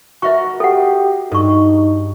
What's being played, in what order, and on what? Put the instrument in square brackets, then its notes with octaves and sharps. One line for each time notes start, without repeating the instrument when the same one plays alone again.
[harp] F#4 A#4 [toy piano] D#5 E5 C#6
[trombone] G4 [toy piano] A4 F#5
[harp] G2 [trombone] D#4 [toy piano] A4 C#6